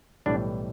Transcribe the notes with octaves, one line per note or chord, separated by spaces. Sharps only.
B1 A2 E3 G3 D4